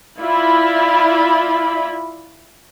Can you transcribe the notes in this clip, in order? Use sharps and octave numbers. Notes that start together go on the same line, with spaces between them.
E4 F4 D5 B5